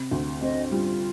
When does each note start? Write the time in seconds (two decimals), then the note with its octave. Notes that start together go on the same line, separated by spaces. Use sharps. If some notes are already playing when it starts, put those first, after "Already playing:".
Already playing: C3
0.11 D2
0.41 C4 D#5
0.71 G3 F4